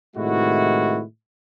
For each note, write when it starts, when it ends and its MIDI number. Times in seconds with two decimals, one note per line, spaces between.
0.16 1.01 45
0.16 1.01 48
0.16 1.01 51
0.16 1.01 56
0.16 1.01 64
0.16 1.01 66